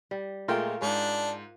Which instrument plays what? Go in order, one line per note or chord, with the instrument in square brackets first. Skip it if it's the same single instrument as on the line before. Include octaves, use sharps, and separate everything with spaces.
[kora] G3
[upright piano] A#2 G#3 A3 [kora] F4 A#4 G5
[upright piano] G#2 [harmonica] D4